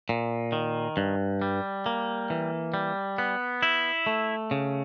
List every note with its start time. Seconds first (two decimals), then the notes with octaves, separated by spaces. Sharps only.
0.09 A#2
0.52 D#3
0.97 G2
1.42 G3
1.86 A#3
2.30 E3
2.74 G3
3.18 B3
3.63 E4
4.06 A3
4.51 C#3